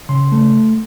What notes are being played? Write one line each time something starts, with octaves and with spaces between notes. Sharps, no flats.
C#3 C6
A3